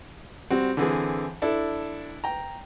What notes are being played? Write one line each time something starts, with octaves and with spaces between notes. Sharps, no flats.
G3 C4 F#4
D3 E3 C4 G#4
D4 E4 A4
G5 A#5